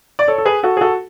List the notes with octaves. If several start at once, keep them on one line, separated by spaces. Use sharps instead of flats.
D5
A4 C#5
A4
G#4 B4
F#4 A4
G#4
F#4 A4